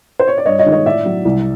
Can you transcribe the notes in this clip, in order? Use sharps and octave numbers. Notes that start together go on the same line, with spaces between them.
C5
C#5
D5
G2 C#5 D#5
C#5 D#5
D#3 G#3
C#5 D#5
A2 D5 E5
F#3
C2